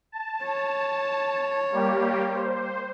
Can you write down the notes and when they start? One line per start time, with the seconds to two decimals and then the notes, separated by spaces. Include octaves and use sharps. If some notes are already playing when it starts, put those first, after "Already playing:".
0.12 A5
0.43 C#5
1.72 G3 A#3 G4
2.35 C5